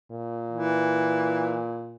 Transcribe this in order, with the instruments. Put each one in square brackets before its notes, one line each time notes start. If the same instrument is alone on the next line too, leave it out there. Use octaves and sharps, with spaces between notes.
[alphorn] A#2
[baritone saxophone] E3